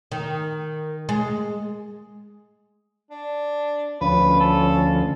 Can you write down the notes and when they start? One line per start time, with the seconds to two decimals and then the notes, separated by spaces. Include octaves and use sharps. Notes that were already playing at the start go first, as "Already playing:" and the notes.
0.12 D#3
1.09 G#3
3.11 D4
4.01 D2 F3 C#4 B4
4.40 A4